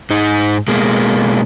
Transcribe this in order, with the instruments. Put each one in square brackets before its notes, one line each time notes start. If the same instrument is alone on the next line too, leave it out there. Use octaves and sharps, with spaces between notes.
[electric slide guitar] G#2 D#4
B2 G#3 A#3